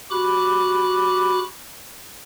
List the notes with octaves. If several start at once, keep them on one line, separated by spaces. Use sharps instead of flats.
F#4 G4 B5 D6 F#6